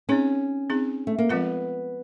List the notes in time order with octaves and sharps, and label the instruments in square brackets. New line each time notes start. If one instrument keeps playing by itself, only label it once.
[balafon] C4 D#4 G#4 [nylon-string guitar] C#4
[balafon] C4 D#4 G#4
[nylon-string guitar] A3
A#3
[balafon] F3 G#3 C4 F4 A#4 [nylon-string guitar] B3